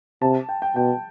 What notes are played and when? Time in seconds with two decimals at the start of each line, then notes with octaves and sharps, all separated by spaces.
0.22 C3 A5
0.49 G5
0.62 G5
0.76 B2 G5